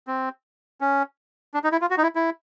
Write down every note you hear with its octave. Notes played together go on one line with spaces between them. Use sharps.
C4
C#4
D4
D#4
E4
F4
F#4
D#4
E4
E4